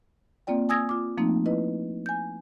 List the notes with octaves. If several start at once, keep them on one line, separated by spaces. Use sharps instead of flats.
A#3 C4 F4 D5 G5
G#5 D#6 E6 G#6 A#6
F4 D6
F3 A3 A#3 C4 D#4
E4 B4 D#5
G#5 G6